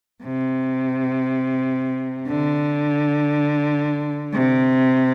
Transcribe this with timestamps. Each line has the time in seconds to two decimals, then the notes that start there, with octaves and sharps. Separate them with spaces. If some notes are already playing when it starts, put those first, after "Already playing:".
0.23 C3
2.28 D3
4.33 C3